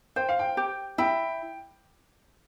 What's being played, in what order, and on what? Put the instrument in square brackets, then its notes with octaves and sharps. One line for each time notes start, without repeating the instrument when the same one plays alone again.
[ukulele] C5 [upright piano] G5
[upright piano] F5
G5
[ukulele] G4
[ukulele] E4 [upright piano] G5